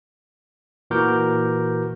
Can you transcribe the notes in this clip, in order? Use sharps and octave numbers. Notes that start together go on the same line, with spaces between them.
A#2 E3 F#4 A#4 D6 G6